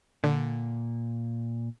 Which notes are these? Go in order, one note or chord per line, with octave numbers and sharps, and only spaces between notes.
A#2 D3